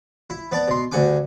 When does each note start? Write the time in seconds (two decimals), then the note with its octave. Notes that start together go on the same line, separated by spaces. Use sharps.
0.30 E4
0.52 B3 D5 A5
0.68 B2 C6
0.92 D2 G2 F#5 G#5 D6